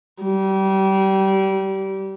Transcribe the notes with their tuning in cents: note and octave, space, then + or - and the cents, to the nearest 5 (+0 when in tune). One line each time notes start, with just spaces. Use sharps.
G3 -25